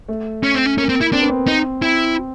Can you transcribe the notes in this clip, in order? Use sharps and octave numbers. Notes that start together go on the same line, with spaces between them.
A3
C#4
C4
C#4
A#3 C#4
C4
E4
C4 D4
B3
C4
D#4
C4 E4